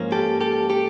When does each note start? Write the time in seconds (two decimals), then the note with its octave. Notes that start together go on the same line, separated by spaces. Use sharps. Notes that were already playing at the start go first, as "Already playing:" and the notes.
Already playing: G#2 F3 A#3 C#4
0.12 G4 A4
0.41 G4 A4
0.70 G4 A4